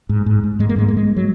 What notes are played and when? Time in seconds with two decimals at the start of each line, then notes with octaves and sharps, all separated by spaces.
0.09 G#2
0.26 G#2
0.44 G#2
0.59 G#2 G#3
0.69 A#3
0.76 G#2 G#3
0.88 A#3
0.93 G#2 G#3
1.17 F#3